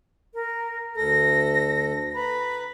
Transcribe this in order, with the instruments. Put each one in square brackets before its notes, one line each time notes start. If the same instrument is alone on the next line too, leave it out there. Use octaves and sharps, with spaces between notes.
[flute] A#4
[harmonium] D2 A4 [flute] A#6
[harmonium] B4 A#5 [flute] B5